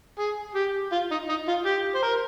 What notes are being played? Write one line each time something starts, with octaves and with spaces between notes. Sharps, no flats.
G#4
G4
F4
D#4
D#4
F4
G4
C5
A#4